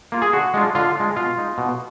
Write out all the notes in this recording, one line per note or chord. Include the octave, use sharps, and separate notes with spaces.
A#3 F4
G#4
D3 F#4
G#3 D4 F4
D3 F4
G#3 D4 F4
B2 F4
G#3 D#4
B2